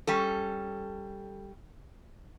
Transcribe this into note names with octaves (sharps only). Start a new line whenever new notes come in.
G3 C#4 A4